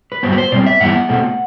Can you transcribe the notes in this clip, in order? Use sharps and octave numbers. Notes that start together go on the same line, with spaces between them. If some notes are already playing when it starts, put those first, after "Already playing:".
B4
G2 F#3 B3 C5
B4
C5
B2 G3 C4 D5
E5
G2 E3 B3 E4 F#5
B2 A3 C4